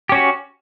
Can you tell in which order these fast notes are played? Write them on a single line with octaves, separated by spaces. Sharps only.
G4 C#4 F#4